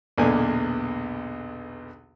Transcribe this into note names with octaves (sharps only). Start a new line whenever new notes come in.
B1 E2 A#2 D3 D5 G#5